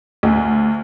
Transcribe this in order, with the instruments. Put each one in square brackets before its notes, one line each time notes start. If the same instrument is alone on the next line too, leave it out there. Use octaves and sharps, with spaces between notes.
[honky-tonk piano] D2